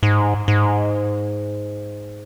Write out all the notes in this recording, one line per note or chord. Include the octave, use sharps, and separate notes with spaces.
G#2
G#2